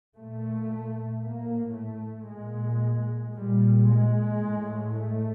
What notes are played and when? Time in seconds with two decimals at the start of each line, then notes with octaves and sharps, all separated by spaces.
0.17 A#2 A3
1.23 A2 A#3
1.76 A3
2.29 A#2 G#3
3.34 A#2 G3
3.88 G#3
4.40 A2
4.93 A3